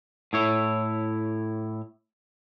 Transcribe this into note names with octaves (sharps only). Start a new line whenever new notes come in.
A2 E4 C#5